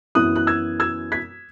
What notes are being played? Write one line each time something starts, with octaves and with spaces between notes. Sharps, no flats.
F#2 E3 B3 E4 D#6 F#6
F#6
E6 G#6
E6 G#6
G#6 B6